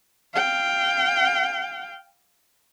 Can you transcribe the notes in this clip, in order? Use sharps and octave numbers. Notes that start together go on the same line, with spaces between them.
F5 G5